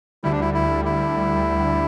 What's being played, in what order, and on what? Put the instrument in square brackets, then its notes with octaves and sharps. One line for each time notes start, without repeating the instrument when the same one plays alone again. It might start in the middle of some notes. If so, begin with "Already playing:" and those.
[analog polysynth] D2 D3 G3 [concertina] E4
[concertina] D4
E4
E4
E4